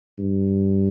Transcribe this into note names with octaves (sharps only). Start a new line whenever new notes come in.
G2